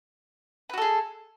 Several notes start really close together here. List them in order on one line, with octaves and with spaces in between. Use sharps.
B4 F#4 A4 G#4